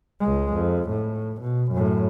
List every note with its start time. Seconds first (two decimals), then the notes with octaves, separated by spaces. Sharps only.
0.20 C#2 G#3
0.53 F2
0.89 A2
1.41 B2
1.72 F#2 A2